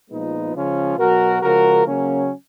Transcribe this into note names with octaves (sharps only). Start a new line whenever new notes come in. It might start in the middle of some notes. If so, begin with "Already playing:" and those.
A#2 F3 G#3 B3 D#4
C#3 F3 G#3 C#4 F4
B2 F#3 F#4 A#4
C#3 F3 G#3 F#4 A#4
C#3 F#3 A#3 C#4